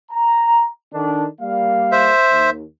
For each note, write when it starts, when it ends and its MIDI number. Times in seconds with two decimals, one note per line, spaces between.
0.11 0.67 82
0.93 1.25 51
0.93 1.25 62
0.93 1.25 69
1.40 2.11 55
1.40 2.11 58
1.40 2.11 77
1.92 2.50 72
1.92 2.50 76
2.31 2.62 39